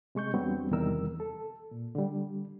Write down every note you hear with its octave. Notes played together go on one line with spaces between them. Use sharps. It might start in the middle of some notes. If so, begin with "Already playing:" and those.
C3 G#3 C#6 G6
E2 F#3 G3 B3 C4 D4
E2 C3 D#3 G3 A#4 E6
A4
A#2
D3 G3